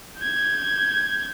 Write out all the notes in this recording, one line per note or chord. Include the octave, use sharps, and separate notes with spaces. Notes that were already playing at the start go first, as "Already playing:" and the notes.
G6 G#6